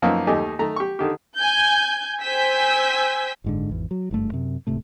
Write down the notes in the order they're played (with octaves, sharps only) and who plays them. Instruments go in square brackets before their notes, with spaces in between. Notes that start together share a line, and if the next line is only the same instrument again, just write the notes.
[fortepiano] F#2 F3 A#3 B3 D#4
D#2 A3 D#4 G4 G#5 D6
D#3 A3 A#5
G4 C#6
D3 D#3 G4
[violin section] G#5 G6
C5 G5 G#5 E6 G6 B6
[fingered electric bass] F#1 G#2 D3
G#1 E2
F#3
F#1 G2 A3
F#2 C3
D1 G#2 C3 A3